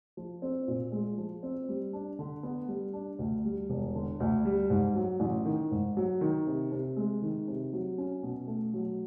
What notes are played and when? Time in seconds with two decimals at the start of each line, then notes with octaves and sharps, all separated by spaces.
0.17 F3
0.42 C4
0.68 A#2
0.92 G#3
1.18 F3
1.43 C4
1.69 G3
1.93 D4
2.19 D3
2.43 B3
2.68 G3
2.93 D4
3.19 D2
3.45 G3
3.70 E1
3.95 D3
4.20 D2
4.45 G3
4.70 G#2
4.95 F#3
5.20 A1
5.45 D#3
5.71 G#2
5.97 F#3
6.21 D#3
6.47 C3
6.72 C3
6.96 G#3
7.22 D#3
7.48 C3
7.73 F#3
7.98 C#4
8.23 B2
8.47 A3
8.74 F#3